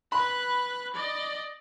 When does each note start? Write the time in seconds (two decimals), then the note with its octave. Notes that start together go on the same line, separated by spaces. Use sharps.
0.12 B4 B5 F#6
0.93 D5 D#5